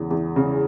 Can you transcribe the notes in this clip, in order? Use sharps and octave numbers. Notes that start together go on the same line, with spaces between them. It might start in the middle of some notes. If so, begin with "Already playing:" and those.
Already playing: E2 C#3
E2
C#3